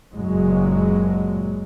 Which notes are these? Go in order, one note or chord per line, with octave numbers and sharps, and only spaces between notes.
F#1 A#2 F#3 G#3